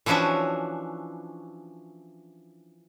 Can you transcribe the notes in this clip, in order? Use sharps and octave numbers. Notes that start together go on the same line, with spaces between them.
E3 F3 C#4 D4 F#4 E5